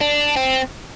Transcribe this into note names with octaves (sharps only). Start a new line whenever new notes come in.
D4
C4